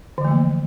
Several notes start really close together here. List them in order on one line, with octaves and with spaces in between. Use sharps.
D3 E3 A3 F3 A#3